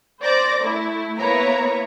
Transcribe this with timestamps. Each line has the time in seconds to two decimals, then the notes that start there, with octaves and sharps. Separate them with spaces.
0.22 C5 D5 D6 A#6
0.60 A3 E4
1.18 A#3 B3 E4 B4 C#5 A#5